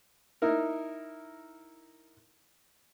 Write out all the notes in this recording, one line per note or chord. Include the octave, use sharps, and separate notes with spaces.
D#4 E4 A#4